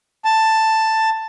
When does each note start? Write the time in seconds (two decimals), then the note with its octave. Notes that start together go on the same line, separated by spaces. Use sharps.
0.25 A5